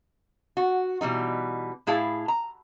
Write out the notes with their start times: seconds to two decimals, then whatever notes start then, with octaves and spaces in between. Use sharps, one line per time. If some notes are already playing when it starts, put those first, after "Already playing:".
0.57 F#4
1.01 B2 E3 G3 D#4
1.87 A2 E4 G#4 F5 A5
2.28 A#5